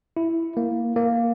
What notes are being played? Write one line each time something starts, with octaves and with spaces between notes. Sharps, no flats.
E4
A#3
A#3